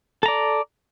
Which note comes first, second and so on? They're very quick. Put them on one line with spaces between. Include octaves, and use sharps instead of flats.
A4 A#5 D5